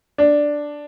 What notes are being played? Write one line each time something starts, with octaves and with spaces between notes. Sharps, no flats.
D4